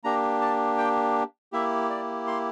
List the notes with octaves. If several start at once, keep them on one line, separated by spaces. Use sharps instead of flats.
A#3 D4 G4 A#5
A5
G5
A#3 E4 G4 E5
D5
C6